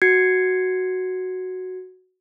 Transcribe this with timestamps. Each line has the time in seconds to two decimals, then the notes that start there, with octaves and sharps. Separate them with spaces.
0.02 F#4 G#6 C7 C#7